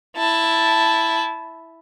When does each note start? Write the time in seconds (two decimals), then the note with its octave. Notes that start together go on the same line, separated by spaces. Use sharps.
0.17 E4 A5